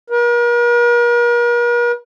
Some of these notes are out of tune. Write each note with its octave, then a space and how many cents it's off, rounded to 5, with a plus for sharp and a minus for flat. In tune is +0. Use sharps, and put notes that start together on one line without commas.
A#4 +45